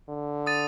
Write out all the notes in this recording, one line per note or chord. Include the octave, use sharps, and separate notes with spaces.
D3
D#6 A6 D#7